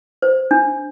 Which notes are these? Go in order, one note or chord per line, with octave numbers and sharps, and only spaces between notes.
C5
D4